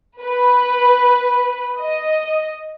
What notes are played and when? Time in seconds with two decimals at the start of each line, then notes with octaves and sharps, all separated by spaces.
0.22 B4
1.79 D#5